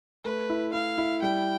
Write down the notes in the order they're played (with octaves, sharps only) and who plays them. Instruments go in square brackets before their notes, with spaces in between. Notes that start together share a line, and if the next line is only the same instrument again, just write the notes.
[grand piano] A3 [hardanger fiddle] B4
[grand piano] E4
[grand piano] E4 [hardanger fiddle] F5
[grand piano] E4
[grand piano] G3 [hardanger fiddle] G5